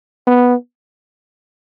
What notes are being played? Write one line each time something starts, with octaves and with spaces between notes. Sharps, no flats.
B3